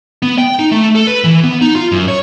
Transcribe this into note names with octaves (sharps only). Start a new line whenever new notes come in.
B3
G5
D#4
A3
A4
B4
E3
B3
D#4
F4
F#2
C#5